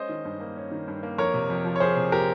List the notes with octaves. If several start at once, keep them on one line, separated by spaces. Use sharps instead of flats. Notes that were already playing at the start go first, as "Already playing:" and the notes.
Already playing: G#3 C#4 C5 D#5
D#3
G2
A#3
C#4
D#3
G2
A#3
F2 A#4 C#5
C3
F2
F3
C#5
F2 G#4 C5
C3
G4 A#4